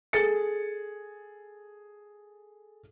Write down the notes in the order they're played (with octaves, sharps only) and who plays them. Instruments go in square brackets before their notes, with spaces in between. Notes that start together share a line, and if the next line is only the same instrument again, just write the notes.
[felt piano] G#4 A4 A6 C#7